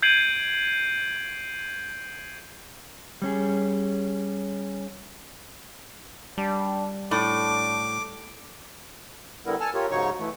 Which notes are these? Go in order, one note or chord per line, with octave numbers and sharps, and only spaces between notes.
G6 G#6 C7 D7 D#7 F#7
G3 C#4 G#4
G3 D4
A2 D4 D6
D3 G3 B3 E4 A#4
A4 G#5 A5 F6
F4 G4 A#4 C#5
G#2 C#3 F#3 D#4 C#5 C#6
E3 A3